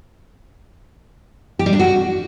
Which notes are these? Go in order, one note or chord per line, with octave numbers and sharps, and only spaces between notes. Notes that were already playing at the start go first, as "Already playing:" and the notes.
G4
G3
D4
F#4